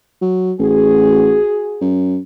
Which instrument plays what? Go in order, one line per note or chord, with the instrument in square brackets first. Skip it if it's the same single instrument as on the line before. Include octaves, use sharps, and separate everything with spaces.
[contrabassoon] F#3
[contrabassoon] A1 [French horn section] F#4 G#4
[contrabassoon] F#2